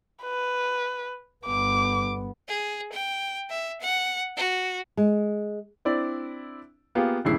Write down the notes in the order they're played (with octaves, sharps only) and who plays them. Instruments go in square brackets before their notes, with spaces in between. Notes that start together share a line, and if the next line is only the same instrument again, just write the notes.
[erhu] B4
[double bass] G1 B3 [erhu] D6
[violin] G#4
G5
E5
F#5
F#4
[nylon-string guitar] G#3
[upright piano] C4 D4 E4 D5
A#3 B3 F4 G4 G#4
D#1 G2 C#3 E4 C7